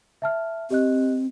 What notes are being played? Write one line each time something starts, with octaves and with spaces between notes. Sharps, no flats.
E5 A5 F6
C4 G4 D#5 F#6